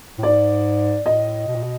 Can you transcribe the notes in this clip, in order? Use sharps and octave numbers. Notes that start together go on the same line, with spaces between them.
A2
G#2 D5
A2 D#5
B2
A#2
B2